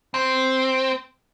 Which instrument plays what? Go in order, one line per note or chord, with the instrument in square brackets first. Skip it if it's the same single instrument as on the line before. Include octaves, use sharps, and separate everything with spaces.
[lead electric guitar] C4